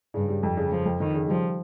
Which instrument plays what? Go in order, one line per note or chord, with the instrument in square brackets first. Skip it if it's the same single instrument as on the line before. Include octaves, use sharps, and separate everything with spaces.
[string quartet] G2 [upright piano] C#3
[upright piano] G3
F2
C#3
[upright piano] F2 [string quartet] F3
[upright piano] F2
[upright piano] F2 [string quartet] D#3
[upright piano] C#3
[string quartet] F3 [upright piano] G3